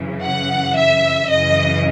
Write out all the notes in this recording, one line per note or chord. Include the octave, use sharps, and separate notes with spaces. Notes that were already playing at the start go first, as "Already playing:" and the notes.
Already playing: F#2 C#3 E3
F#5
E5
F#2 C#3 E3 D#5